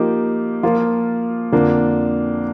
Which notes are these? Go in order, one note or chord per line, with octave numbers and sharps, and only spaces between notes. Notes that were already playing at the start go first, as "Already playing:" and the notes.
Already playing: F3 A#3 D#4 G4
F3 A#3 F4
F2 D3 F3 A#3 D4